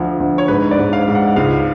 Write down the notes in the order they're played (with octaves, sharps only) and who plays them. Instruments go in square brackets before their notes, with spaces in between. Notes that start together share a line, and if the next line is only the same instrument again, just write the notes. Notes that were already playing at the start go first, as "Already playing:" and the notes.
Already playing: [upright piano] D2 F3
D2
[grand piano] C#5
[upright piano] G#2 [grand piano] B4
[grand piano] D5
[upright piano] G#2
[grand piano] F5
[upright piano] G#2
[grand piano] F#5
[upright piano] C#2 [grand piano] F5